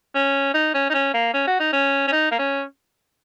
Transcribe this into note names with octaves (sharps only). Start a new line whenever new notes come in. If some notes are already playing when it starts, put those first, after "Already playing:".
C#4
D#4
C#4
D#4
C#4
A#3
C#4
F#4
D#4
C#4
C#4
D#4
A#3
C#4